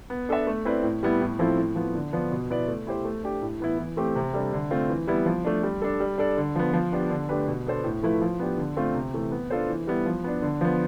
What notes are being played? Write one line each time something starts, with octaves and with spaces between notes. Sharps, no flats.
B3
D4 A4 E5
A3
C4 E4 B4 D5
A2
G3 B3 E4
A2
F3 C4 E4 A4
A2
F3 B3
D3
F3 B3 D4
B2
B3 E4 B4 D5
A3
E4 G4 C5
A3
D4 G4
A2
E3 B3 E4
E3
A3 C4 G4
C3
G3 D4 A4
D3
A3 C4 F4
E3
G3 B3 E4
F3
A3 D4
G3
D4 A4
G3
D4 A4 D5
D3
F3 B3
F3
B3 D4 G4
D3
A3 D4 G4 B4
B2
B3 D4 A4 C5
A2
F3 A3 E4 B4
F3
B3 D4 G4
D3
A3 C4 F4
C3
E3 A3
B3
D4 F4 A4 C5
E3
G3 B3 E4
F3
B3 D4
D3
F3 B3